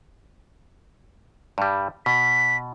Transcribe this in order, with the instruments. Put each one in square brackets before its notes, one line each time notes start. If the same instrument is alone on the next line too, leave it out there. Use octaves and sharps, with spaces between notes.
[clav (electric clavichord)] G2 G3
[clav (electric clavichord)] B2 [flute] B6